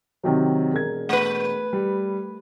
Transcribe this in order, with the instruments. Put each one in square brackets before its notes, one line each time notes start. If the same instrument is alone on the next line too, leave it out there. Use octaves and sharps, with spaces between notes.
[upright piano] C3 D#3 F#3
E1 A#4 G#6
[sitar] A3 B4
[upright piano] G3